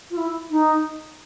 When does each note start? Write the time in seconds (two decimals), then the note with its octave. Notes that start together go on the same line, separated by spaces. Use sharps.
0.11 F4
0.17 E4
0.50 D#4